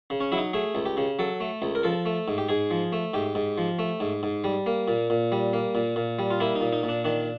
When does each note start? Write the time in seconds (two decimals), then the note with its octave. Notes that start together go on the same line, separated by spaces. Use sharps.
0.10 C#3
0.20 C#4
0.32 F#3 E4
0.38 D#4
0.53 A3 G#4
0.75 C#2
0.86 G4
0.97 C#3
1.19 F#3 A4
1.40 A3
1.62 C#2
1.75 A#4
1.83 F3 A4
2.06 A3
2.28 G#2
2.38 G4
2.49 G#2 G#4
2.71 F3
2.92 A3
3.14 G#2 G4
3.35 G#2
3.58 F3
3.79 A3
4.00 G#2
4.23 G#2
4.44 G3
4.66 A#3
4.88 A#2
5.10 A#2
5.32 G3
5.53 A#3
5.75 A#2
5.96 A#2
6.19 G3
6.31 F4
6.40 A#3 E4
6.55 D#4
6.61 A#2
6.73 D#4
6.83 A#2
6.89 D4
7.04 D#3 D4